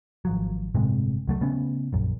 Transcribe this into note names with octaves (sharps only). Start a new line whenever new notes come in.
G#1 F3 F#3
G1 A2 C3 G#3
C#2 F#3 A3
C#3 A3 B3 C#4
A#1 F#2